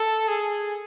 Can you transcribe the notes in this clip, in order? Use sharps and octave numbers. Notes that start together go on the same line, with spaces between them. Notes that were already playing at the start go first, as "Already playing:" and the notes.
Already playing: A4
G#4